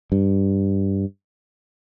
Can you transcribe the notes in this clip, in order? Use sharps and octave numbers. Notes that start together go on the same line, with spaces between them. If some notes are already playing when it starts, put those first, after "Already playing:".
G2